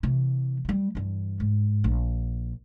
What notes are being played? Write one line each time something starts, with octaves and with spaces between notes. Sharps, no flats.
C3 E3
F#3 G3
G2 E3
G#2
A#1